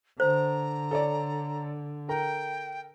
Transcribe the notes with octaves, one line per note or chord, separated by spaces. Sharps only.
D3 C5 A#5
A4 C#5 D5
A4 A#4 G5 A#5